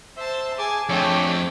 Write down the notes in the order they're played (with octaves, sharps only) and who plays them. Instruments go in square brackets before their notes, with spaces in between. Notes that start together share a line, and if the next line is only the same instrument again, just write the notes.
[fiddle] C5 A5 [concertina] E5
[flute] G#4 [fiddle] G#5 A5 [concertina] D6
[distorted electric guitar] F2 [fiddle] A3 G5 [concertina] D4 C#5 D5